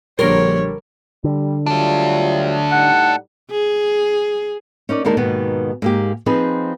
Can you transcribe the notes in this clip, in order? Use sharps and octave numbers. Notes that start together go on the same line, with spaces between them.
A#1 D3 G3 A#4 C#5 C6
D3 G3
F#3 G3 A3 D4 F4
A2 G3 D#4 F#5
G#4
C#4 D#4 A#4 D5
D#2 D3 G#3 D#4 A#4 A5
D#2 G#2 B2 D#3 B3
G#2 A#3 G4
F3 C4 D#4 G#4 B4